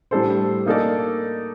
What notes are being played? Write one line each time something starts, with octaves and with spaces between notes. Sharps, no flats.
A2 G3 D4 A4 C5
A#3 D#4 A4 D5